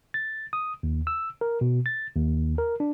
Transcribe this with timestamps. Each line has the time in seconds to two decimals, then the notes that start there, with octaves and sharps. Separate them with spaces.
0.14 A6
0.53 D#6
0.83 D#2
1.07 E6
1.41 A#4
1.61 B2
1.86 A6
2.16 D#2
2.58 A#4
2.80 D4